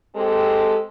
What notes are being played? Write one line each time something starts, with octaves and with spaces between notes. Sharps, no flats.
G#3 C4 G4 A4